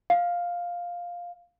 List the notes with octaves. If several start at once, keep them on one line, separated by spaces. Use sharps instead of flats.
F5